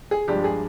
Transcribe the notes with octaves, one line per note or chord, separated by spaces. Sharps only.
G#4
G2 F3 G#3 D4 G4
G#4